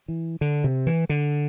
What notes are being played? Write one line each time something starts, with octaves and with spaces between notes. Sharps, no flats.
E3
D3
C3
E3
D3